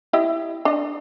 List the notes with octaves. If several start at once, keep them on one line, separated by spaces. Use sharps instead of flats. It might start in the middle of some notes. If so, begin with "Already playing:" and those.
E4 G4 D#5
D4 D#5